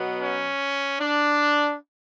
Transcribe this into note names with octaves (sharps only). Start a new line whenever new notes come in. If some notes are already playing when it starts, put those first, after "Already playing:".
Already playing: B2 F#3 B3
C#4
D4